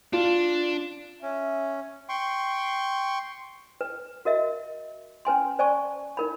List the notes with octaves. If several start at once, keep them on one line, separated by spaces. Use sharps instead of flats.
D4 F4
C#4 E5
G5 C6 C#6
B4
F#4 A#4 D#5 E5
C#4 B4 G#5 C6
C5 D5 G#5 A5 C#6
D#4 A#4 B5